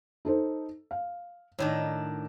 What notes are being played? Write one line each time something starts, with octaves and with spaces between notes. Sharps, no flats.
D#4 A4 C5
F5
A2 D#3 D4 C#5